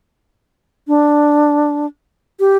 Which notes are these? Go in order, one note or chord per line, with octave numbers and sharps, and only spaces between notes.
D4
G4